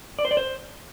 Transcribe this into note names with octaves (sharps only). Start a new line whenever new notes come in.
D5
C5
D5
C5